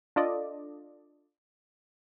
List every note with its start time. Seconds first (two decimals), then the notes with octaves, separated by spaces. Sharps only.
0.16 D4 F4 A4 D5 D#5